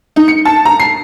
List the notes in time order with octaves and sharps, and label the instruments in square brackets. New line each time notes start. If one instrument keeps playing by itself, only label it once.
[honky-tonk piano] D#4
C#7
A5
A#5
C7